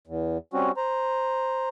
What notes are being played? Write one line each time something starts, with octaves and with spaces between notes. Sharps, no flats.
E2
G3 C4 C#4 F#4
C5 A#5